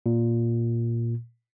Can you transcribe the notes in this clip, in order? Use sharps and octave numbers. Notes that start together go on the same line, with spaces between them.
A#2